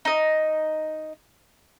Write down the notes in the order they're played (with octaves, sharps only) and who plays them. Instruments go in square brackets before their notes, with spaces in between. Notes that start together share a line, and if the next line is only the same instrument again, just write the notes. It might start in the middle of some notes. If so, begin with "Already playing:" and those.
[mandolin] D#4 D#5